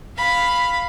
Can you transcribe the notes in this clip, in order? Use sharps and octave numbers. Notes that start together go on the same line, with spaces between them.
F5 B5